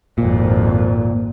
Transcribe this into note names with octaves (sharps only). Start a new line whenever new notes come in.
G#1 F2 A#2